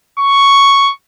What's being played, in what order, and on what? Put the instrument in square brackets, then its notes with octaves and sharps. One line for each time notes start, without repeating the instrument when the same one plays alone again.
[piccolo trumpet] C#6